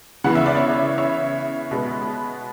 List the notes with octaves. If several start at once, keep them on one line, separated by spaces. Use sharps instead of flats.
C#3 E3 B3 F#5
E5
D5
C#5 E5
C#5 E5
B2 G#3 B3